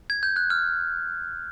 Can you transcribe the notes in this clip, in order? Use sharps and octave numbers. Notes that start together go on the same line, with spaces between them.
G#6
G6
F#6
F6